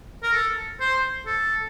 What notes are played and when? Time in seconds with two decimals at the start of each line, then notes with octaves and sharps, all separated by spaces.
0.23 A#4
0.33 A4
0.80 C5
1.26 A4